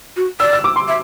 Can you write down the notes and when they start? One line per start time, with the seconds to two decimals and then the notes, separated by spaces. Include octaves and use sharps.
0.17 F#4
0.40 D5 E6
0.53 E6
0.64 D6
0.76 C6
0.88 E5